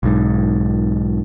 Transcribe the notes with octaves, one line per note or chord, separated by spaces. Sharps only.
B1 G#2